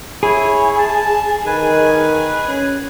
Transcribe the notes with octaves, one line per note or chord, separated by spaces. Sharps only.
E4 G#4 C#5
A5
D#3 B4 G#5
C#4